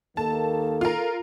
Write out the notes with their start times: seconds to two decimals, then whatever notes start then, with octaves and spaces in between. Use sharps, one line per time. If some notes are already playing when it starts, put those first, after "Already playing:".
0.17 D#2 D#3 A#3 A4 A5
0.81 F4 A#4